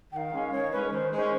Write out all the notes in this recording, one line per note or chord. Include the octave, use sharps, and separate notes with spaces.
D#3 F5 G5
G#3 C#4
D#3 C#5
G#3 C#4 B4
D#3 C5
G#3 C#4 C5